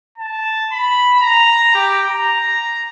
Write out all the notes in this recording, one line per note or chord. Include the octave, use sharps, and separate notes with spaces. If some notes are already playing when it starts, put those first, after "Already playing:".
A5
B5
A#5
G4
A#5